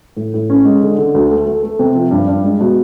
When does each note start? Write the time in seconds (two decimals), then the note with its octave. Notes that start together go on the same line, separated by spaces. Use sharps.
0.17 A2
0.34 A2
0.50 C#4
0.65 G#3
0.83 D3
0.98 D3
1.15 D2
1.31 A3
1.47 A3
1.63 A3
1.79 C3
1.95 F3
2.11 G2
2.28 G2
2.44 G#3
2.61 B2